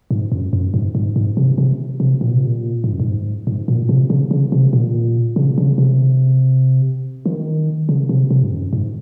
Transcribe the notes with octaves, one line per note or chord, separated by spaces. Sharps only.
G#2
F#2
F#2
G#2
G#2
G#2
C3
C3
C3
A#2
C3
A#2
G#2
F#2
G#2
G#2
A#2
C3
C#3
C#3
C3
A#2
C#3
C#3
C3
D#3
C#3
C3
C3
G#2
F#2
G#2